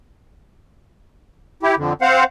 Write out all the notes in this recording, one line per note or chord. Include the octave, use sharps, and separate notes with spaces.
E4 G4
F2 D3
C4 C5 F5 F#5